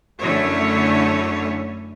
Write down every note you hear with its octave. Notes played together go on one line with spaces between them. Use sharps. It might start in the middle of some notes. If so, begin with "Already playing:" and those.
F#2 D3 A3 C#4 E4 C#5